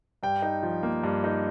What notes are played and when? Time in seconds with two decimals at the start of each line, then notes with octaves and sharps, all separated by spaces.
0.23 G2 G5
0.42 D#4
0.63 F3
0.83 A#3
1.04 G2
1.24 D#4